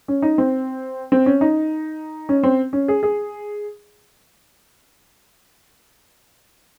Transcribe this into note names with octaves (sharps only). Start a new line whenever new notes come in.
C#4
D#4
C4
C4
C#4
D#4
C#4
C4
C#4
G#4
G#4